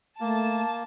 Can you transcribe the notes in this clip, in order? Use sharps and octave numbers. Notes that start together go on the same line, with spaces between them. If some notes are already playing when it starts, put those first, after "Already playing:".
A3 A#3 A5